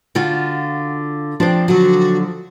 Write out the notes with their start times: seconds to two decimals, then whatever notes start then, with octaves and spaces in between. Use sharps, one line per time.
0.15 D3 F4 F#4
1.40 F3 C4 D4
1.68 D3 F#3 F#4